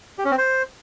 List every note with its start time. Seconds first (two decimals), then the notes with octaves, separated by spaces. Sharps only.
0.18 G4
0.25 C#4
0.31 C4
0.38 C5